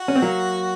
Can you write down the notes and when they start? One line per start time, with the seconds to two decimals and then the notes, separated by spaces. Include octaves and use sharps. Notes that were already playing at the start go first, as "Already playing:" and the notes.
Already playing: F#4
0.08 C#4
0.16 C4
0.22 F#3 A#3